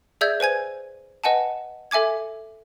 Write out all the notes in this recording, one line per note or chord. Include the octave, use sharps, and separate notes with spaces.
G#4 D5 E5 E6 G6 G#6
B4 C5 G#5 G#6
B4 D#5 F#5 G#5 A5
A4 E5 G#5 D6 G#6